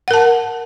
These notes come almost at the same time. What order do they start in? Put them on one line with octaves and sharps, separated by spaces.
F#5 A#4 A5